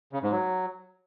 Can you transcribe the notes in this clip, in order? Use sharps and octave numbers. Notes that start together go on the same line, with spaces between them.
C#3
G#2
F#3